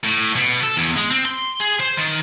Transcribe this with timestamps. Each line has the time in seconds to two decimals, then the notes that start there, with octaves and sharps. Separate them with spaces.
0.04 A2
0.36 B2
0.63 A4
0.77 E2
0.96 G#3
1.10 C4
1.25 C6
1.60 G#4
1.80 C5
1.97 D#3